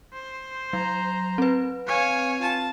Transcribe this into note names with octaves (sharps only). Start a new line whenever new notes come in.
C5
F#3 A#5
C4 B4
C#5 F5 G#5
F4 A5